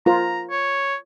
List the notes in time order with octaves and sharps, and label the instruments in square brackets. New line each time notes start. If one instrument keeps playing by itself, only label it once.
[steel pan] F4 A#4 C5 [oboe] A#5
[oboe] C#5